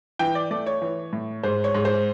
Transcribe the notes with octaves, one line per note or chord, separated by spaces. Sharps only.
E3 G5
D5
A3 D5
C#5
E3
A2
G#2 C5
C#5
G#2
C5